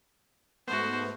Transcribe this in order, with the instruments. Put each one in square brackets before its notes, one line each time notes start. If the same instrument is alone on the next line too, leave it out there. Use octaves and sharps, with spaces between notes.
[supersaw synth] G#2 A3 B3 [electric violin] F#4 C5